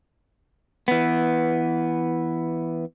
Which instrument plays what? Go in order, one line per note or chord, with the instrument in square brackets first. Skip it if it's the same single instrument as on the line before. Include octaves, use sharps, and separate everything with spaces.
[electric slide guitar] E3 B3